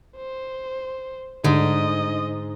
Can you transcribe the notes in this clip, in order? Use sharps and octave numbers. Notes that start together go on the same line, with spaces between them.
C5
G#2 D3 D#5